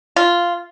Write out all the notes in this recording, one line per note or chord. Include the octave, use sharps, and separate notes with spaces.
F4